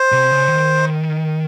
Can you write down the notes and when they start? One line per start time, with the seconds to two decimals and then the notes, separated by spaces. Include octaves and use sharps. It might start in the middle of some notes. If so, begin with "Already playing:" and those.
Already playing: C5
0.12 C3
0.31 C#3
0.48 D#3